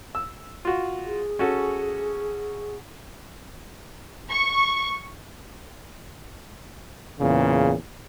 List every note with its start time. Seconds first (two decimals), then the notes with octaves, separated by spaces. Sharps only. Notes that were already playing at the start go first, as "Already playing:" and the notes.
0.15 E6
0.65 F4 F#4
1.05 G#4
1.39 C#4 F#4 A4
4.31 C#6
7.19 E2 A#2 C#3